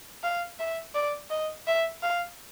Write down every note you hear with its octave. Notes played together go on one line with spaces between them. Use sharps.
F5
E5
D5
D#5
E5
F5